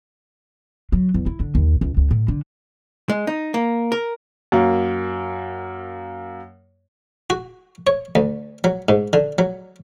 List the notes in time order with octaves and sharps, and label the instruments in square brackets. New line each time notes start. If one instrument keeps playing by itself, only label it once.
[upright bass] F#3
E2
E4
D3
D#2
C#2
C#2
A2
D3
[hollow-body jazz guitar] G#3
D#4
A#3
A#4
[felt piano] F#2 A#3
[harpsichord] F#4
C#5
D2
F#3
G#2
D3
F#3